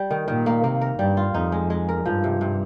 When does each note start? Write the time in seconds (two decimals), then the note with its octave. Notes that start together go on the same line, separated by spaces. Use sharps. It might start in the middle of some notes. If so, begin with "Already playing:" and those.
Already playing: G3
0.10 D#3
0.28 A#2 D#3
0.46 A#3
0.63 C3 A#3
0.81 A#4
0.99 G2 G3
1.17 F4
1.34 F2 D#4
1.52 G#3
1.70 G#3
1.89 A#4
2.05 G2 F3
2.24 C3
2.41 C3